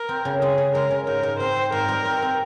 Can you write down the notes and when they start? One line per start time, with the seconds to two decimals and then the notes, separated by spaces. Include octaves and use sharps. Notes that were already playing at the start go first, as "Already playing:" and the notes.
Already playing: A#4
0.09 C4
0.25 C#3
0.42 G#3 G#4
0.58 C#3
0.75 G#3 A#4
0.91 C#3
1.07 G#2 A#4
1.23 G#2
1.40 C4 C5
1.56 C4
1.72 G#2 A#4
1.88 G3
2.05 C4
2.22 C4